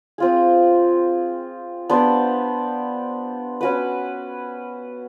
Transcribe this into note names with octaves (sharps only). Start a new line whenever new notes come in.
C4 F4 G#4
B3 D4 G4 C5
C#4 F#4 B4